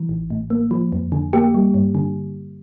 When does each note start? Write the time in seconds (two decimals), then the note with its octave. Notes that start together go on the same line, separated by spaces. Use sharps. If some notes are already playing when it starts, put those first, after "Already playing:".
Already playing: E3
0.09 A1
0.30 A2
0.50 A#3
0.71 F3
0.92 F2
1.12 D3
1.33 A#3 G4
1.54 G3
1.74 G2
1.95 D3